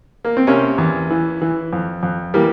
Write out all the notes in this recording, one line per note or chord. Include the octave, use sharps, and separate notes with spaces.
A#3
C4
C3 A#3 C#4
E2
E3
E3
F2
F2
E3 G3 A#3